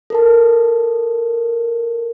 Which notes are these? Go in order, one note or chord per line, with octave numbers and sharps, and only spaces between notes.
A4 A#4 A5